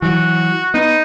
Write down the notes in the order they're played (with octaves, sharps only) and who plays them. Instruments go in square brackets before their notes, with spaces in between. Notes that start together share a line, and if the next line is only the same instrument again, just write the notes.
[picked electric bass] E3 F#3 [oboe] F#4
[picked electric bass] B3 [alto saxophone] D#4